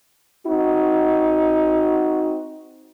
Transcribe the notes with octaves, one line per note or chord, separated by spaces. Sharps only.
C4 D#4 F#4